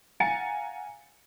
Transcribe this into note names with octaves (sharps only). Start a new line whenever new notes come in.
F5 F#5 G#5 A#5 A6 C#7